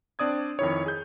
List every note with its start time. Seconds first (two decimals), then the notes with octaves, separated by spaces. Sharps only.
0.19 C4 D4 D5 D#6 G#6
0.59 F2 D#3 E4 C#5
0.86 G#4 G6